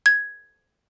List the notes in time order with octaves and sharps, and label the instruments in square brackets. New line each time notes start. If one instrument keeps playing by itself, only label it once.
[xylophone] G#6